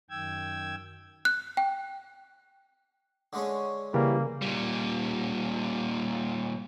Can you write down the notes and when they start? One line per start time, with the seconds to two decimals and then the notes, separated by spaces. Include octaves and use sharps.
0.10 F#2 D#3 G5 E6 G#6
1.25 F#6
1.57 G5
3.33 D3 G#3 C#4
3.94 C#3 E3 G3 A#3
4.42 A#2 G3